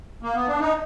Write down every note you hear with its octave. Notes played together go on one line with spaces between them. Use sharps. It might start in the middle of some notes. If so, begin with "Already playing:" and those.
A#3
B3
D4
D#4